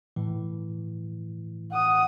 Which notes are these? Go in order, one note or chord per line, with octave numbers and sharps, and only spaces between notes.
A2 E3
F#5 D#6